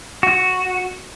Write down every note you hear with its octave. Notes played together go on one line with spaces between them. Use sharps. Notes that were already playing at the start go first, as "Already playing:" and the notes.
F#4